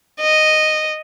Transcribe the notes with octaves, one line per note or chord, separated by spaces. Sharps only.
D#5